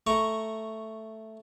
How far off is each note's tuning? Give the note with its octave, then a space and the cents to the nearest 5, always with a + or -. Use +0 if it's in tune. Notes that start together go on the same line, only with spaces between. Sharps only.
A3 +0 A#5 +0 C#6 +0